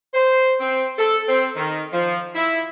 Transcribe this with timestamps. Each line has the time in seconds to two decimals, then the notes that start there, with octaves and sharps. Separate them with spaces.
0.14 C5
0.60 C4
0.99 A4
1.28 C4
1.57 D#3
1.93 F3
2.35 E4